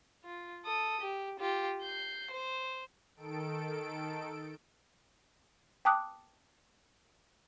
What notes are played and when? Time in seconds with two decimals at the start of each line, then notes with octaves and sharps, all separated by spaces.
0.24 F4
0.65 A4 D#6
1.01 G4
1.40 F4 G4
1.82 G6 C7
2.31 C5
3.16 D#3 A4 D7
5.85 G5 A5 D6 D#6 F#6